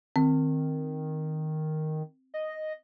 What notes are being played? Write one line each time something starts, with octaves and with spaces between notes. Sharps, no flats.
D#3 C4
D#5